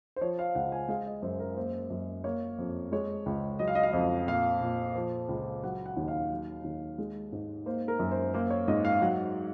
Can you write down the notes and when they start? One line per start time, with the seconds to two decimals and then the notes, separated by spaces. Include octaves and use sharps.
0.16 C5
0.21 F3 C#5
0.39 F5
0.55 C#2 F#5
0.72 G#5
0.88 G#3 F5
1.06 D#5
1.22 F#2 C5
1.40 A#4
1.56 A#3 C5
1.90 F#2
2.24 A#3 C#5
2.59 F2
2.92 G#3 C#5
3.26 C#2
3.59 F#3 D#5
3.68 F5
3.75 D#5
3.83 F5
3.91 F2 D#5
4.28 A#2 F5
4.61 A#2
4.96 F3
5.29 C#2
5.64 F#3 F#5
5.86 F#5
5.97 D#2
6.08 F5
6.31 F#3
6.64 D#2
6.98 G#3
7.32 G#2
7.66 A#3 C5
7.88 A#4
7.99 F#2
8.11 C5
8.34 A#3 C5
8.50 C#5
8.68 G#2 D#5
8.85 F5
9.02 F#3 F#5